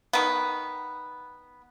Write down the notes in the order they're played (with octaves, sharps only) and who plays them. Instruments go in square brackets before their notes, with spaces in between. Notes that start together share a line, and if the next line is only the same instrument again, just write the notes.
[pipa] D#3 B3